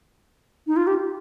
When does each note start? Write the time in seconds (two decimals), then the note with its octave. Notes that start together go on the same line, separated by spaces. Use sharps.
0.67 D#4
0.77 F4
0.87 G4